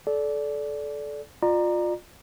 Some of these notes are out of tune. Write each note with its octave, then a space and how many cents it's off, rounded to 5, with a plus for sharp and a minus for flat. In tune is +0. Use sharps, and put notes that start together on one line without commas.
A4 -25 D5 -15
F4 +20 D5 +35 A#5 +5